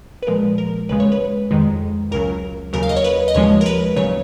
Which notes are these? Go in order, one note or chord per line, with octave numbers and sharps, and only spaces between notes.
B4
A#2 F3 G#3 A#4
A#4
D#2 C#3 G#3 B4
C#5
B4
F2 D#3 G#3
C#2 C#3 F#3 A#4
D#2 C#3 F#3 A#4
F5
D#5
C#5
B4
D#5
D#2 C#3 F3 G#3 C#5
A#4
B4
D#2 C#3 F#3 C#5